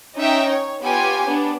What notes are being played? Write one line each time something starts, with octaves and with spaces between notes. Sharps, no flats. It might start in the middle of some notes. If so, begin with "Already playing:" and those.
C#4 D#4 E5 G5
C#5
B3 F4 G4 C#5 G#5
B3 D4